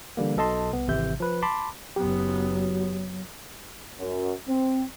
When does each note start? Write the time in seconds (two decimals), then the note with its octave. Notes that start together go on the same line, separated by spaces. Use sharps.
0.17 D3 E3 G3 A#3
0.37 B1 B2 A4 D#5 A5 C6
0.73 C2 B3
0.88 G#1 C3 E3 E5 G6
1.20 F3 B4
1.42 A5 B5 C6 D6
1.96 F#1 F#3 B3 G4
3.99 F#2
4.48 C4